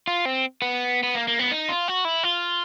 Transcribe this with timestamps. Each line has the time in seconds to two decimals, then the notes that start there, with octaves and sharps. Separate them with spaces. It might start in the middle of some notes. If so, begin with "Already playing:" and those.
0.07 F4
0.25 C4
0.62 B3
1.03 B3
1.15 A#3
1.28 A#3
1.39 B3
1.52 D#4
1.69 F4
1.88 F#4
2.05 E4
2.24 F4